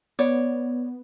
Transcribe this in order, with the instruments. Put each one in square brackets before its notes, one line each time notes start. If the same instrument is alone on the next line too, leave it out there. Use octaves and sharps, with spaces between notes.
[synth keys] B3 [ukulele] C#5 D5